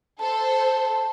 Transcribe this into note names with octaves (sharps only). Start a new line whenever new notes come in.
A4 C5 A5